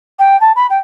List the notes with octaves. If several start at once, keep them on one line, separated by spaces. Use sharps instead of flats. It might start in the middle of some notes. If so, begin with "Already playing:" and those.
G5
A5
B5
G5